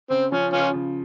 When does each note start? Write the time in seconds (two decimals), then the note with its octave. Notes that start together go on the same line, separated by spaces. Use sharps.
0.10 C#3 C4
0.32 F3 C#4
0.53 C#3 C#4 F4
0.74 C#3